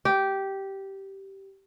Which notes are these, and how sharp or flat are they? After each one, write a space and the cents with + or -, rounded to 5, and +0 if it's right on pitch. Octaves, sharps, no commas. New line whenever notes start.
G4 -10